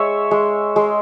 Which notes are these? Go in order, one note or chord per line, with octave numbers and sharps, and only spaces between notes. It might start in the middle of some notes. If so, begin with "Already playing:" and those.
Already playing: G#3 C#5 E5
G#3
G#3